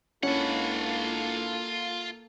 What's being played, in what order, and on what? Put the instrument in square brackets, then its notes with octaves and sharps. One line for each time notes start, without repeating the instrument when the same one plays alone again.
[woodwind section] C#2 D4 E4 [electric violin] A#3 A4 [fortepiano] C#4 [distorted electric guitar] F4 F#5